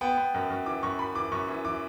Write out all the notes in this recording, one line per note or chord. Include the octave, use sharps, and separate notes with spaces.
B3 G5
B3
F#2
F#2
E3 D6
F#2 C#6
F#2 B5
E3 D6
F#2 C#6
E3
E3 D6